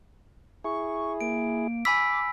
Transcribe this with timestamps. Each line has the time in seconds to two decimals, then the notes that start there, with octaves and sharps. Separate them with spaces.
0.64 E4 G#4 C#6
1.21 A#3 D7
1.85 G#5 B5 D6 E6 B6